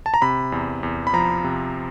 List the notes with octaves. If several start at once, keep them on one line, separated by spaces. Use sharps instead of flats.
A5
A#5
C3 B5
E2
E2
B5
F3 A#5
C3